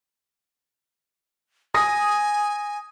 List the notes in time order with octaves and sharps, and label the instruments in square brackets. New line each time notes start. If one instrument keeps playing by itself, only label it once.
[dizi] G#5 [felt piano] D#6 A#6